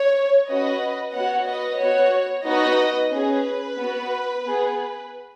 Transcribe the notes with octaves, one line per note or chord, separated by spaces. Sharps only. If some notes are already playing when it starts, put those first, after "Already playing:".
Already playing: C#5
C#4 F#4 B4 D#5
B3 F#4 C#5 F#5
B4 D#5
B3 F#4 C#5
B3 D#4 F#4 B4 D#5
C#4 G#4 B4
B3 F#4
B3 G#4